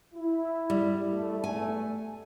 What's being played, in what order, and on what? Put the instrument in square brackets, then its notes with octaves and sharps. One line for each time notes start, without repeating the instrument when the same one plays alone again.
[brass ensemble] E4
[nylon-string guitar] G3
[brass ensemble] E2 A3
[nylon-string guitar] G#5